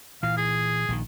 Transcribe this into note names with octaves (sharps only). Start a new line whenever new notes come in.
A#2 E3 F5
G#4
A#1 D3 D#3